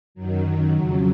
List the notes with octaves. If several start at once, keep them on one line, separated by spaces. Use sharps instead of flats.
F#2 D#3 F#3
F2 C#3 F#3